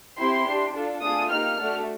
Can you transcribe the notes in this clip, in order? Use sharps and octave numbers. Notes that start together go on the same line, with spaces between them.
C4 E4 G4 C6
D4 G4
D4 F4 A4
A3 D4 F4 G#4 D#6
A#3 D#4 G4 F6
A3 D4 F#4 A4